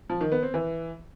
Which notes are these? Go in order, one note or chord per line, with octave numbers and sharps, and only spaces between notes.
F3
D#3
B3
C4
E3